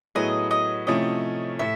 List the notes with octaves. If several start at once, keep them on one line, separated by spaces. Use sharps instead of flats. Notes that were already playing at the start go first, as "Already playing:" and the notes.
A2 F#3 B3 E4 G#4 D#5
D#5
C3 F3 A3 C#4 E4 D#5
A2 E5